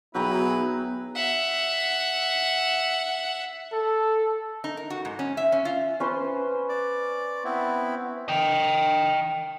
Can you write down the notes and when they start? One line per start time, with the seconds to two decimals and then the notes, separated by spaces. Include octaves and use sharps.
0.14 B1 F#3 B3 E4 G#4 B4 G5 A#5
1.15 E5 F#5
3.72 A4
4.64 D#4
4.77 A#4
4.90 F#4
5.05 G#2
5.19 C#4
5.37 E5
5.52 C#4
5.65 F4
6.00 C#4 B4 C5
6.69 D5
7.45 B3 C4 E4
8.28 D#5 G5